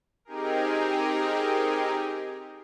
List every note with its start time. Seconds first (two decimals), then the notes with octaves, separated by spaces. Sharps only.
0.25 C4 D#4 G4 G#4 A#4